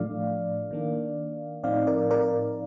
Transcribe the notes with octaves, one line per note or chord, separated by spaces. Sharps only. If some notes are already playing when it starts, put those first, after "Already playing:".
Already playing: A2 F3 A3 D4 D5 F5
D#3 A#3 D4
A2 F3 C4 D#4 D5 F5
A#4 D5
A#4 D5